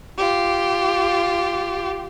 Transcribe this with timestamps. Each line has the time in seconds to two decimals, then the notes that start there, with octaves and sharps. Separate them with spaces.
0.19 F4 G4